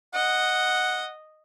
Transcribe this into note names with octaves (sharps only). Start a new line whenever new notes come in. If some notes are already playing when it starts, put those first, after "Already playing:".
D#5 F#5